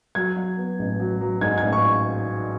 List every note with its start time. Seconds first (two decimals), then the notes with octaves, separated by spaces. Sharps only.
0.15 F#3 G#6
0.36 F#3
0.57 B3
0.79 A1
1.00 F#3
1.21 F#3
1.41 G#2 G#6
1.58 A1 G#6
1.73 C#6